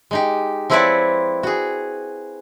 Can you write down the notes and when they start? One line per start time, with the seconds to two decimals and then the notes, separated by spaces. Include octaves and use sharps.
0.11 G#3 D#4 G4
0.70 F3 C4 E4 B4 C#5 D5
1.43 F#4 G#4